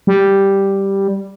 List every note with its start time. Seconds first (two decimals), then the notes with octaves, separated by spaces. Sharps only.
0.07 G3